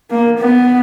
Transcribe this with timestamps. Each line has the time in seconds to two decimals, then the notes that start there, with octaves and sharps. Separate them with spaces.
0.11 A#3
0.38 B3